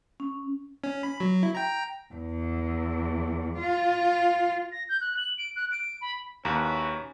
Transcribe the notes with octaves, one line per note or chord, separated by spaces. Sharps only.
C#4
C#4
B5
F#3
E4
G5 A#5
E2
F4
A#6
G6
F#6
F#7
D7
F#6
D7
B5
D#2 C#4 E4 F#4 B4 A#5